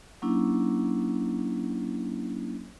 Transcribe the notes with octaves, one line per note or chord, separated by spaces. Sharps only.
F#3 A#3 C#4 D4 E4